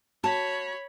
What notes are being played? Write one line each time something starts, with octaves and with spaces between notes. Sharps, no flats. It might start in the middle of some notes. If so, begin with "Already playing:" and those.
F#4 C#5 A5 B5